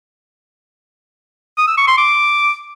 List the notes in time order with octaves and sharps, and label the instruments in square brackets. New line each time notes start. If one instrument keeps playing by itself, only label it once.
[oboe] D#6
E6
C#6
C6
D6